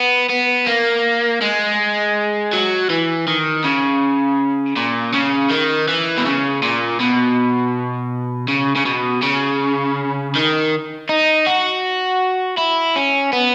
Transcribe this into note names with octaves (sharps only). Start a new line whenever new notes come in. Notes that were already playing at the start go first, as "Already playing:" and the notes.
Already playing: B3
B3
A#3
G#3
F#3
E3
D#3
C#3
A#2
C#3
D#3
E3
B2
C#3
A#2
B2
C#3
C#3
B2
C#3
D#3
D#4
F#4
E4
C#4
B3